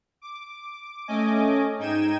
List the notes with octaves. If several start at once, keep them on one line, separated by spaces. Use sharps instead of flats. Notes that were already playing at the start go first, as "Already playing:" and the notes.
D6
A3 C#4 D#5 G#5 D6
G#2 D#4 G5 G#6 D#7 E7